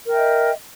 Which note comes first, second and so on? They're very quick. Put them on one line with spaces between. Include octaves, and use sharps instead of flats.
A#4 G5 E5 D#5